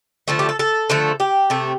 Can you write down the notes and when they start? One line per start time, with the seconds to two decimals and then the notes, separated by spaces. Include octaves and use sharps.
0.28 D3 F3 A3 A4
0.39 G4
0.49 A4
0.59 A4
0.90 D3 F3 A3
1.20 G4
1.50 C3 A3